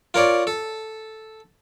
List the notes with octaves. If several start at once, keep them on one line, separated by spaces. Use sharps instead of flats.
F4 A#4 C#5 D5
A4